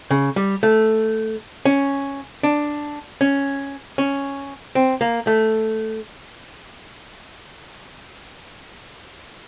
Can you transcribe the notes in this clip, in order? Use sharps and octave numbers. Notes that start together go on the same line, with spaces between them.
C#3
G3
A3
C#4
D4
C#4
C#4
C4
A#3
A3